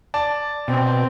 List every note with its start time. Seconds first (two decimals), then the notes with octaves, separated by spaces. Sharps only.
0.14 D5 A5
0.68 B2 C4